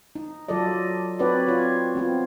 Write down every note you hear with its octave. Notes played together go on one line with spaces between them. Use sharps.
D#4
F#3 F4 A4 D5 D#5
C4 D#4 F#4 B4 C#5 D5
C4 F4 C#5
B3 C4 F4